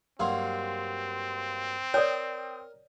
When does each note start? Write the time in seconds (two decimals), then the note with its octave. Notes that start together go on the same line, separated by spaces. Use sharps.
0.20 G2 F#3 A#3 C4 F5 C6
1.94 A#4 C#5 D5 G5 D#6